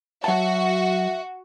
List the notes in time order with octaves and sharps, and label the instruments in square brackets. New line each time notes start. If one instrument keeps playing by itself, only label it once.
[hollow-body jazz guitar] F#3 A5 [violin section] F#4 [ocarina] E5